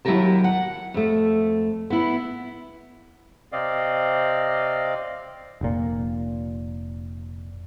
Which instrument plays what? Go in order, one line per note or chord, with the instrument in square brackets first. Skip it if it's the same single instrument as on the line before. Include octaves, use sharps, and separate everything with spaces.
[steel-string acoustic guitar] D#2 F#3 E4 G4 A#4 A5
F#5
F2 A3
B3 E4
[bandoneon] C3 C4 D5 D#5 F5
[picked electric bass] F1 A#2